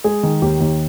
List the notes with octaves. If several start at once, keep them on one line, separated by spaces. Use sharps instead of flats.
G#3 G#4
D#3
D#2 G4
D#2